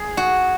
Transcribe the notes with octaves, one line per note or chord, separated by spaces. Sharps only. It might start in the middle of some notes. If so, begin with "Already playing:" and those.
Already playing: G#4
F#4